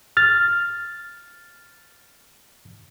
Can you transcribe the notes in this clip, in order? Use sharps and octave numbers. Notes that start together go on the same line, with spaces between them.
F6 A6